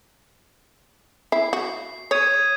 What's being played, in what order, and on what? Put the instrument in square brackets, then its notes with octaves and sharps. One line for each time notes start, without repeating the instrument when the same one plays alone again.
[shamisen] E4 [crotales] C7
[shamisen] F#4
[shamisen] C#5 [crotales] D#6 G#6 D#7